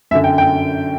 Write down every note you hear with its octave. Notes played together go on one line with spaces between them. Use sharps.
F#2 D3 E5
G5
G5